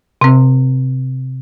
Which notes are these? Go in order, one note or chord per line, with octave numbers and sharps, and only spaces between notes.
C3 C4